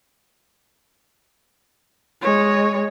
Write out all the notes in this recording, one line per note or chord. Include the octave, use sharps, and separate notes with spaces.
G#3 C#5